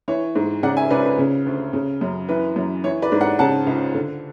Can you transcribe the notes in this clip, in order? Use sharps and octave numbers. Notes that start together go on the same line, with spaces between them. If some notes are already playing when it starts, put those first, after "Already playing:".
E3 C#5
G#2
C#3 D5 F#5
E5 G#5
C#2 B4 D5
B4
C#3
D2
C#3
F#2
E3 B4
F#2
E3 C#5
B4 D5
G#2
D5 F#5
C#3 F#5 A5
C#2
D3